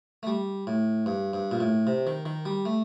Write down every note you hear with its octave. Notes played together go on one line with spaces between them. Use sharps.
A3
G3
A2
G2
G2
A#2
A2
C3
D#3
D#3
G3
A3